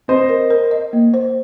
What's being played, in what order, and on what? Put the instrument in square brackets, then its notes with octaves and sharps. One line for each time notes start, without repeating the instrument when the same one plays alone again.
[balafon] C4 [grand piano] C5 D#5
[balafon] A#4
A#4
D#5
A#3
C5